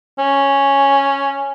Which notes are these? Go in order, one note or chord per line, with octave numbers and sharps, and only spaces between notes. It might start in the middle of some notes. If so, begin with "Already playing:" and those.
C#4